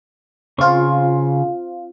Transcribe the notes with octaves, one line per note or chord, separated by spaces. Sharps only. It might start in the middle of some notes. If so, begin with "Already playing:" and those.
C#3 C4 F4 C#6